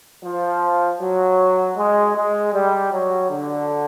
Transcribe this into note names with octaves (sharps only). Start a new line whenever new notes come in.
F3
F#3
G#3
G#3
G3
F#3
D3